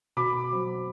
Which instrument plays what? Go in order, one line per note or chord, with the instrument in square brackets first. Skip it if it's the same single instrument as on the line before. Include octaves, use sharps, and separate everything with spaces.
[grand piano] B2 B5 D6
F#3 C4